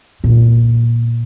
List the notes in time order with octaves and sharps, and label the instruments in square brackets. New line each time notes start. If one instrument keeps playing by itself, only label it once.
[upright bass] A#2